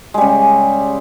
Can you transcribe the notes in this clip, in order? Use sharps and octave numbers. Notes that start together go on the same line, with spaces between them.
C#3 G3 G#3